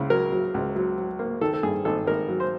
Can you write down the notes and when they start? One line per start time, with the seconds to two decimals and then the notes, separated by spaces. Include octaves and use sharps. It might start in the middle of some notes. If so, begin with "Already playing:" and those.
Already playing: C#2 C#3 E4
0.10 F#3 A#4
0.32 F#3
0.54 C#2
0.76 F#3
0.98 F#3
1.19 A#3
1.41 D#3 A4
1.54 A4
1.63 G2 G#4
1.85 G#1 A4
2.07 G#1 A#4
2.29 F#3
2.40 C5